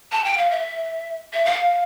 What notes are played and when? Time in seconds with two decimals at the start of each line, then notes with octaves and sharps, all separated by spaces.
0.12 A5
0.24 G5
0.37 F5
0.50 E5
1.33 E5
1.45 F5